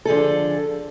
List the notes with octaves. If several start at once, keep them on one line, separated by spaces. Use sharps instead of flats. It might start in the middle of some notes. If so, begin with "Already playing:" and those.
D3 F3 G#4 A4